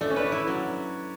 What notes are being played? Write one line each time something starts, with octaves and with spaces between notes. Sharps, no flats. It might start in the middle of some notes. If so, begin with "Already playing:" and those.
A3 D4
C#4
D4 B4
E4
F#3